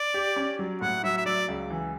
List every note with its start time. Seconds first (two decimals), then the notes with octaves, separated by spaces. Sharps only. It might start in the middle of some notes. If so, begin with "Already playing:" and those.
Already playing: D5
0.14 G4
0.36 C#4
0.59 F#3
0.81 A2 F#5
1.03 F#3 E5
1.17 E5
1.25 F#3 D5
1.48 C#2
1.70 E3